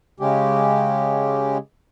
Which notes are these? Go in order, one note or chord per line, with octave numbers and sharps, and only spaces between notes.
C#3 G#3 C#4 G4